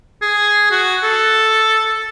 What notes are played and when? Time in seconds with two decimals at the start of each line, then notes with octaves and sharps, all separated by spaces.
0.22 G#4
0.71 F#4
1.03 A4